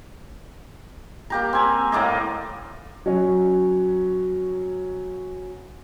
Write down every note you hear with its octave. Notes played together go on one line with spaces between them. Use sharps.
A#3 G4 A#5
C4 G#5
A2 A#3 D5 D#5
F#3 C#4